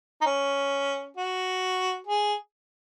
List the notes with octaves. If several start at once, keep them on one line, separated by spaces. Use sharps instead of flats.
D#4
C#4
F#4
G#4